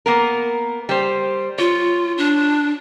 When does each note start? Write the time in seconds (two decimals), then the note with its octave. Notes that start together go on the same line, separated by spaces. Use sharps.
0.06 A#3 B3 A#4
0.89 G3 C5
1.58 F4 C#5
2.18 D4